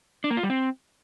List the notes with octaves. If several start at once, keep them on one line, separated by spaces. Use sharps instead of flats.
D4
A#3
F4
G3
C4